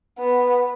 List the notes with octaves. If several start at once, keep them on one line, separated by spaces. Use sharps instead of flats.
B3